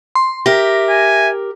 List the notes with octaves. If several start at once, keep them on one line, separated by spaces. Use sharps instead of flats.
C6
G4 A#4 E5 A#6
G#5